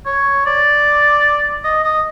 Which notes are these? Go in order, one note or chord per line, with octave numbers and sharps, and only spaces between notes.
C#5
D5
D#5
D#5